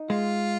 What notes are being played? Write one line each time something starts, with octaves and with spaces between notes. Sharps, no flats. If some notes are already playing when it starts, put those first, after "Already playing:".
Already playing: D#4
G#3 F4